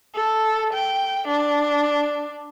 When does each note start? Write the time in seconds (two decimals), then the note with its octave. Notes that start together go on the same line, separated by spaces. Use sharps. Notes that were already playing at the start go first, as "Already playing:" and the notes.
0.16 A4
0.73 G5
1.28 D4